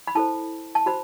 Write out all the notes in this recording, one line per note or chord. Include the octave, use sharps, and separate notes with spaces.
B5
E4 A4 C5 A5
A5
F#4 C5 B5